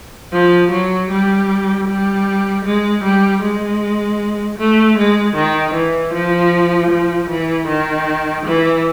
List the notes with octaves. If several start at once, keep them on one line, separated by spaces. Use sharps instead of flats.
F3
F#3
G3
G3
G#3
G3
G#3
A3
G#3
D#3
E3
F3
F3
E3
D#3
E3